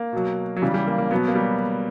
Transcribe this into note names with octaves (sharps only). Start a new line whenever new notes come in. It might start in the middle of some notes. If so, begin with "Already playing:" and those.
Already playing: A#3
B2 F#3
F#3
C#3 E3 G3
G3
A#3
A#3
B2 F#3 B3
A#3
G3